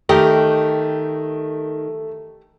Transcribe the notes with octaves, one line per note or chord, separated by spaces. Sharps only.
D#3 A3 G4 A#4 D#5